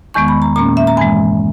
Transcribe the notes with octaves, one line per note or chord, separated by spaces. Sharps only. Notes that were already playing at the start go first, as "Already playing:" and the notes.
E2 D#3 G#3 B3 C#6
B5
A#5
A#2 A#3 C#4 A#5
E5
A#5
G2 E3 G#3 G#5